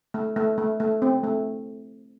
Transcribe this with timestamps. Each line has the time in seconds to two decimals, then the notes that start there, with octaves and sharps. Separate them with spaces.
0.14 A3
0.36 A3
0.58 A3
0.80 A3
1.02 C4
1.24 A3